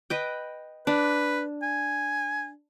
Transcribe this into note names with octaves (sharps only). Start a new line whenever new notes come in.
B4 D#5 G5
D4 B4
G#5